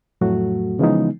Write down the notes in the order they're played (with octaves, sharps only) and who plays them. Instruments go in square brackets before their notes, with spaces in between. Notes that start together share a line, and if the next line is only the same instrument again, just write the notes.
[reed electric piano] F2 A2 F#3 A3 F#4
C#3 E3 F3 G#3 B3 D#4